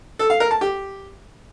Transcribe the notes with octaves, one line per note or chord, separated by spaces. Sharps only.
A4
F5
A#4
A5
G4